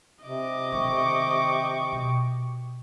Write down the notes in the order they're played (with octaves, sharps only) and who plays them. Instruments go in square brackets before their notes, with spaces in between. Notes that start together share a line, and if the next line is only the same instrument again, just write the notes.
[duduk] C3 [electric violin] D#5 D6
[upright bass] D3 D#3 [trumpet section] G5 C#6
[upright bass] B2